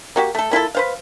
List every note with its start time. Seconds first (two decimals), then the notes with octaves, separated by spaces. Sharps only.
0.16 A#3 F#4 G4
0.35 A3 A4
0.51 A#3 E4 F4 A4
0.75 B4 C5 F5